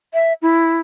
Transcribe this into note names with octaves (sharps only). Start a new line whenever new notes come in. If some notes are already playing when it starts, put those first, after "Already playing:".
E5
E4